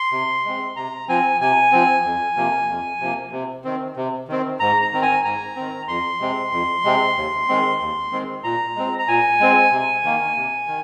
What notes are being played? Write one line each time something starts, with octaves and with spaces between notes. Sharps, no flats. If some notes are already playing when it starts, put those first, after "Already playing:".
Already playing: C6
C3
G#3 C4
C3 A#5
F3 C4 G#5
C3 G#5
F3 C4
F2
C3 F3 A#3
F2
C3 F3 A#3
C3
D#3 C4
C3
D#3 C4
G#2 A#5
A#5
D#3 C4
G#5
G#2 A#5
D#3 C4
F2 C6
C3 G#3 C4
F2
C3 G#3 C4
D#2
D#3 G#3 C4
D#2
D#3 G#3 C4
A#2 A#5
G#3 C4
A#5
A#2 G#5
G#3 C4
C3
D#3 A#3
C3
D#3